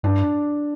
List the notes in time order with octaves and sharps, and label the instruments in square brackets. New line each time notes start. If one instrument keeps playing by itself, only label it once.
[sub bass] G2 [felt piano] D4